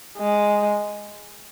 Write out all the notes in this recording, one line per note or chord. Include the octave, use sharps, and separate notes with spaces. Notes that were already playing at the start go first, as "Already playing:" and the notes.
G#3